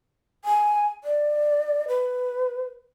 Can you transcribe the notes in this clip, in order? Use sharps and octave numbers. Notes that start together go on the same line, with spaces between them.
G#5
D5
B4